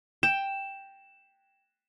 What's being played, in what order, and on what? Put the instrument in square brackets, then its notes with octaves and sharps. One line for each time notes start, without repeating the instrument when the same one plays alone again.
[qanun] G5 [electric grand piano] E7